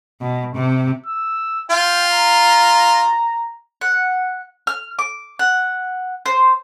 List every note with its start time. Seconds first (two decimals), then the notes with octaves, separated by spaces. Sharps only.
0.21 B2
0.55 C3
1.06 E6
1.70 F4 G5
2.12 A#5
3.81 F#5
4.67 F6
4.99 D6
5.39 F#5
6.26 C5